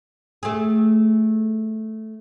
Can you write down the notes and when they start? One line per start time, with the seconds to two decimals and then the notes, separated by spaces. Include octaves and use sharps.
0.43 A3 G#4